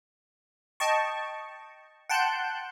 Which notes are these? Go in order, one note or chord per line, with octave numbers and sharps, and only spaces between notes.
D#5 G5 A5 C#6
F#5 G5 A5 C6 F#6 G6